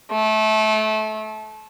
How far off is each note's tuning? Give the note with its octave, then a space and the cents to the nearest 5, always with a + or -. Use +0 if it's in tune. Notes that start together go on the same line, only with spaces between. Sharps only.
A3 -25